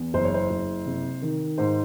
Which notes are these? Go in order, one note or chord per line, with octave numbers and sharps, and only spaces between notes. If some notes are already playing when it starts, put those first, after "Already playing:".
Already playing: E2
F#1 C5
C#5
C5
F#1
C3
D#3
G#2 C5